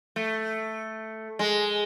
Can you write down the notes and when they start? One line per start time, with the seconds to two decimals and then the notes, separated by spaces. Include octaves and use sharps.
0.16 A3
1.39 G#3